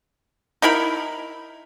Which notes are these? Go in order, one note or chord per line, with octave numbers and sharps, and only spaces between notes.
D#4 E4 A#4 B5